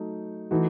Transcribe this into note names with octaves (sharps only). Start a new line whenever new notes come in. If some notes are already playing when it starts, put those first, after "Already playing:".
Already playing: F#3 A3 D#4
E3 A3 D#4 F#4